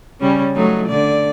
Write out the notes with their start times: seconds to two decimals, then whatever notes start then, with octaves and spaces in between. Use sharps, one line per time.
0.20 C#3 G3 C#4
0.55 F#3 A3 D#4
0.88 D3 D5